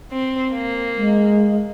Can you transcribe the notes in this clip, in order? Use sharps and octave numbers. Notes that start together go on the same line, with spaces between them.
C4
A#3
G#3